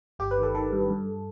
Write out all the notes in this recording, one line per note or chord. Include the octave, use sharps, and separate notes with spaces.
G1 G4
B4
D#3
A4
D#3 A4
G2
G2